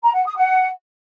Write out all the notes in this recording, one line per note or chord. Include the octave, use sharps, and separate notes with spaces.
A#5
F#5
D#6
F#5